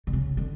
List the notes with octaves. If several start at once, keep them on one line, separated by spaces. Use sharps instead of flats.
D3
C#3
D3